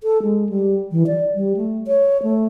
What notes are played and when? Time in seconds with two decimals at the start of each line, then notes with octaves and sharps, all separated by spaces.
0.03 A4
0.23 G#3
0.49 G3
0.92 E3
1.07 D5
1.35 G3
1.57 A3
1.87 C#5
2.23 A3